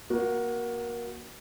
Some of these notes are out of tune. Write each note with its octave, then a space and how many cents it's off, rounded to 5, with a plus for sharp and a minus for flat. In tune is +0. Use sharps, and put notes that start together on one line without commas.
A#3 +20 F#4 +0